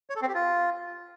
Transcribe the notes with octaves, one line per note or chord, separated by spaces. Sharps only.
C#5
A4
C4
G4
F4